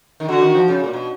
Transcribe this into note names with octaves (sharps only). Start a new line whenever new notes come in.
D#3
D3 F#4
D#3
F3
C#3
A#2
B2